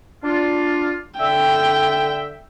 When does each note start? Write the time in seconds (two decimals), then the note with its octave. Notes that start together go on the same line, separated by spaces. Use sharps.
0.23 D4 F4
1.19 D3 E5 G5